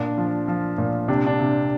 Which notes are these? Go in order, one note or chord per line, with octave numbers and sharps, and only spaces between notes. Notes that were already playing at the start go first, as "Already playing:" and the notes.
Already playing: A#2 D4
F3
F3
A#2
C3 D4
D4
C3